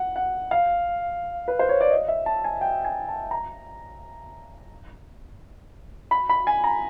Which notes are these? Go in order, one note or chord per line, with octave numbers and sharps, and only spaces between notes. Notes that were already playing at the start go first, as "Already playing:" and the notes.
Already playing: F#5
F#5
F5
B4
C5
C#5
D5
D#5
E5
A5
G#5
G5
G#5
A5
A#5
B5
B5
G#5
A#5